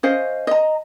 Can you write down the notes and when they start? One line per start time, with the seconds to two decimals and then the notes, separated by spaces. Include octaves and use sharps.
0.03 C#4 C5 D#5 F5
0.47 D#5 A#5